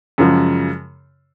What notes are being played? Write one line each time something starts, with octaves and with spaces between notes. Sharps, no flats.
F#2 C#3 F3 G#3